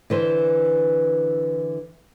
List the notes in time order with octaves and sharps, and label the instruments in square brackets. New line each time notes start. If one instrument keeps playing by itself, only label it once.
[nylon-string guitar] D3 E3 C5